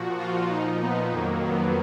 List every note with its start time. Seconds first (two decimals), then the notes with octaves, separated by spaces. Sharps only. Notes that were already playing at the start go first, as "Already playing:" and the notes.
Already playing: A#2 F3 F#4
0.17 F4
0.48 A#2 F3 D#4
0.80 B3
1.11 F2 D#3 F#3 A#3
1.43 B3